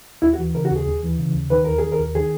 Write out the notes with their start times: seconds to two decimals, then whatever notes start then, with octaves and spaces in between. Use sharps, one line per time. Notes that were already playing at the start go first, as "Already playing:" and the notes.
0.22 D#2 E4
0.33 F#4
0.38 E3
0.55 C#3 A#4
0.65 F#4
0.71 D#2
0.76 G#4
0.87 D#2
1.03 E3
1.18 C#3
1.34 D#2
1.50 D#3 B4
1.65 D#2 A#4
1.78 D#3 G#4
1.92 A#4
1.99 D#2
2.15 D#3 G#4